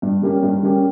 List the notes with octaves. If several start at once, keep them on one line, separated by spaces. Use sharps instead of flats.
G2
G3 A#3 C#4 G4
G2
G3 A#3 C#4 G4